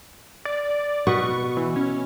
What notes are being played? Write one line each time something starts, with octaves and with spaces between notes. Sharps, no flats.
D5
B2 F#4 B4 C#6
E3
C#4